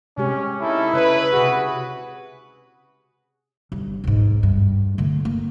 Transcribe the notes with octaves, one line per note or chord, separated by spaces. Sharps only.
C3 G#3 C#4 G4
C#4 D#4 E4 A4
C#3 B4 C#5
C3 F#4 G#4
G1
B1 G#2
G2
D3 A3
A#3